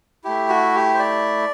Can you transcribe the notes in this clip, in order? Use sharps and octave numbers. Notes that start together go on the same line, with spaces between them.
A3 E4 G4
F#4
G4
C5
D5